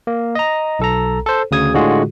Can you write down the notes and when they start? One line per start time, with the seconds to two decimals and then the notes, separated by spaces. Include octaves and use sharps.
0.07 A#3
0.35 D#5 A#5
0.79 B1 A4 A#5
1.26 A4 C5
1.51 D2 C#3 D#6 G#6
1.74 A2 D3 G#3 F4 F#4 G#4